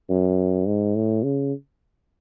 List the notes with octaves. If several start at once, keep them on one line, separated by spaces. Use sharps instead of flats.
F#2
G#2
A2
C#3